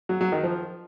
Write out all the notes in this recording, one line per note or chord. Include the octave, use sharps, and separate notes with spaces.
F#3
F#3
D#3
F3